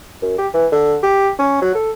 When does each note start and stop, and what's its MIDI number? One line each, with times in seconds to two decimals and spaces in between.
0.22 0.35 42
0.38 0.48 67
0.54 0.67 52
0.72 0.96 50
1.03 1.30 67
1.39 1.58 61
1.62 1.73 54
1.75 1.91 69